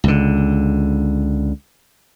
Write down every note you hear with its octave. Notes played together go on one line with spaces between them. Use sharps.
C#2 D3